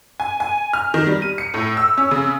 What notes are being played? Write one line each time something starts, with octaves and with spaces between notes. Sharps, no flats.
G#5
G#5
F6
D#3
G3
D#7
C#7
A2
E6
C#4
C#3